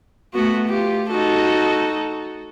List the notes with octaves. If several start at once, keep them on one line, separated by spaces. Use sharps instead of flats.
A3 B3 F#4
F4 G4
D#4 F#4 A4